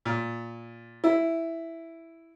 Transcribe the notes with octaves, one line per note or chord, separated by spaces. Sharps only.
A#2
E4